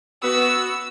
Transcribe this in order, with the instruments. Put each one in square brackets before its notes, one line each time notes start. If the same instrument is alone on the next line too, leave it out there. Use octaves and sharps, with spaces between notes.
[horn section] B3 F#4 [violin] E6